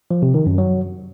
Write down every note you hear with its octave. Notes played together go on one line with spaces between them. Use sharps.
F3
C3
D#3
F#2
F#3